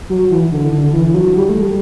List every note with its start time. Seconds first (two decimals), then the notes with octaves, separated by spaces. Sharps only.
0.10 F#3
0.31 E3
0.52 D3
0.72 D3
0.93 E3
1.08 E3
1.14 F#3
1.36 G3
1.49 A3
1.61 G3